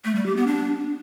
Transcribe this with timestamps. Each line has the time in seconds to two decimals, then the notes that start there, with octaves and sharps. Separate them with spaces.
0.05 A3
0.15 G3
0.26 G4
0.36 B3
0.47 D4